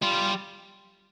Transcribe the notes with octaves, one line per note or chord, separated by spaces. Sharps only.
G3 F4